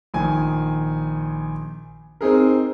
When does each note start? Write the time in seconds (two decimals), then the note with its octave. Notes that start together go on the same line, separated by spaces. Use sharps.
0.14 A#1 D#3 G#5
2.21 C4 D#4 G#4 A#4